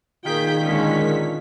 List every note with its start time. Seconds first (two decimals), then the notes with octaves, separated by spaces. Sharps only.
0.25 A#2 D#3 F4 G#4 G5 B6
0.62 D3 G#3 C#4